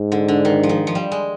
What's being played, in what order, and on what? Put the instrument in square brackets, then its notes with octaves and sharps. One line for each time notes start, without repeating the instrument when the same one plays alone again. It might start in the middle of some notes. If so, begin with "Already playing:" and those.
Already playing: [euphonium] G#2
[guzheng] D3
D3
D#3
F3
D#3
F3
G3
G#3